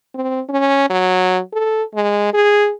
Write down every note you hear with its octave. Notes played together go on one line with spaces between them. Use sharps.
C4
C#4
F#3
A4
G#3
G#4